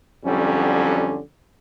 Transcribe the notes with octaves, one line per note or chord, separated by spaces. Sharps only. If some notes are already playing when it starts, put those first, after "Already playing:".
F2 D3 F#3 G3 C#4